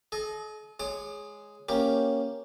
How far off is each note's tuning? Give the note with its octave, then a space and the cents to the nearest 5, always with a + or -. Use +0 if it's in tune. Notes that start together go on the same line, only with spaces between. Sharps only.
A4 -45 D#5 -10
G#3 +0 C#5 +5 D6 +40
A#3 +0 C#4 +0 G4 +0